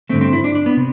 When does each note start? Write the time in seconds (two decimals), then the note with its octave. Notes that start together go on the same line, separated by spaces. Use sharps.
0.09 G2 D3 A3 C4
0.21 C4
0.33 E4
0.44 D4
0.55 D4
0.66 B3
0.77 C3